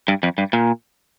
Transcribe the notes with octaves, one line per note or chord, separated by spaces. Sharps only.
G2
F2
G2
A#2